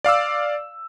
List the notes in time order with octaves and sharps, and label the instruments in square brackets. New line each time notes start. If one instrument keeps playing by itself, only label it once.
[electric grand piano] D5 F5 D6 E6